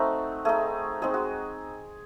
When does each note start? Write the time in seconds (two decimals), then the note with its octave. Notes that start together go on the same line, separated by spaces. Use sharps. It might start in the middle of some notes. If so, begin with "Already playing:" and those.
Already playing: A3 C4 D#4 F#4
0.45 A3 D#4 G#4
1.02 G#3 C4 D#4 G#4
1.14 F#4